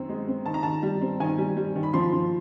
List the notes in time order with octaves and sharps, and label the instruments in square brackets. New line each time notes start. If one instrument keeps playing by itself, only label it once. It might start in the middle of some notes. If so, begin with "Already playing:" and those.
Already playing: [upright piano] F#2 D#3 C4
G#3
C4
D#3 A5
A#5
D#3 A5
G3
C4
D#3 G#5
G3
G3
D#3
B5
F3 C6
F3